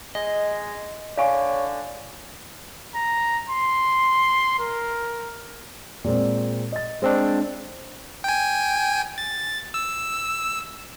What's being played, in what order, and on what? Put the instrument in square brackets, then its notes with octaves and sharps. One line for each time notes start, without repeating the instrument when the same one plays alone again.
[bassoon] G#3 [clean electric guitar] D#5
[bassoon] D3 [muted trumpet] C#5 [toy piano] F5 G#5 C#6
[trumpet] A#5
C6
A#4
[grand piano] A#2 G#3 C4
D#5 A6
[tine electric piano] G#3 C4 D4 [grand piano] C5
[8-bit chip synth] G5 G#5
A6
E6